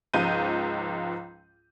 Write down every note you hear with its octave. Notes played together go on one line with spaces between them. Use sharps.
C#2 G#2 F3 G6 D#7